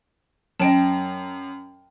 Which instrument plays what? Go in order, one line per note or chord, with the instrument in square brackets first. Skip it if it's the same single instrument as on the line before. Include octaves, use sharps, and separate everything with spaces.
[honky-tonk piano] F#2 [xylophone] D#5 G5 A5